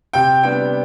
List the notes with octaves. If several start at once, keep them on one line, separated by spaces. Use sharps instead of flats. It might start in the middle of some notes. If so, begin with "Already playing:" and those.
C3 G5
G3 B3 D4 G5